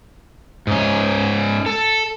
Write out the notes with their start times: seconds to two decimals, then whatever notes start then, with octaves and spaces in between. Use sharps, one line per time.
0.67 G#2 C#4
1.66 A4